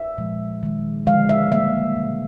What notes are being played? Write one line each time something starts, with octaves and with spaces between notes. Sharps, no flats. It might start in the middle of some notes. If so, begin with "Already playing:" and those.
Already playing: E5
A#2 F3 G#3
D#3 G#3
D3 F3 G#3 F5
E5
D#3 G3 A#3 E5
B2 G#3